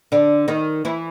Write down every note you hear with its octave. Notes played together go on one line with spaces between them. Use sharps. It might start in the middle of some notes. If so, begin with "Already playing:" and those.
D3 D4
D#3 D#4
E3 E4